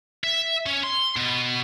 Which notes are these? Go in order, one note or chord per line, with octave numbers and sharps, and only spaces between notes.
E5
C#4
C6
B2